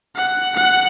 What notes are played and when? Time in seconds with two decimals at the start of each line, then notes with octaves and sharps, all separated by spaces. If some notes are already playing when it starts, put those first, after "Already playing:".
0.16 F#5
0.56 F#5